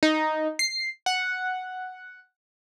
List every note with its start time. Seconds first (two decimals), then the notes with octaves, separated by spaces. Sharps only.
0.03 D#4
0.59 C7
1.06 F#5